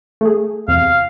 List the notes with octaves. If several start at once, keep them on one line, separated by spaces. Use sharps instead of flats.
A3 G#4
E2 C3 F5